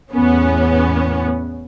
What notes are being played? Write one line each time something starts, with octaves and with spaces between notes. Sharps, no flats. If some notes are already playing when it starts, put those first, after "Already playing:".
E2 A2 B3 C#4